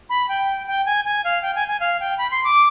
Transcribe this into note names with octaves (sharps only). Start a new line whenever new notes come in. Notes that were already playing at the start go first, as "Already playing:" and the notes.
B5
G5
G5
G#5
G#5
F5
G5
G#5
G#5
F5
G5
B5
C6
D6